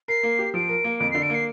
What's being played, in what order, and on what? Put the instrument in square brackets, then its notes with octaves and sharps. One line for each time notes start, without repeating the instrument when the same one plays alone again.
[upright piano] A#4 [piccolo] C7
[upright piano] A#3
G4
[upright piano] F3 [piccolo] D7
[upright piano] A#4
A#3
[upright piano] F2 [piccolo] D7
[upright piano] D3 [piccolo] C7
[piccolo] D7
[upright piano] A#3 [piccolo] C7